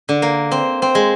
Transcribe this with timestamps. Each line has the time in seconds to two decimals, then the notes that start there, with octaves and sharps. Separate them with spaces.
0.09 D3
0.22 A#3
0.52 C4
0.82 C4
0.95 G#3